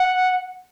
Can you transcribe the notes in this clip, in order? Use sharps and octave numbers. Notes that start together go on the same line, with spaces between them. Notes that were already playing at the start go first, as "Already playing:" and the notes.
Already playing: F#5